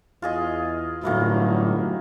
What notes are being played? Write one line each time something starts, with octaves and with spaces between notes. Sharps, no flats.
E2 F4 G#4 D#5
G1 A2 D#3 F#3 A#3 E4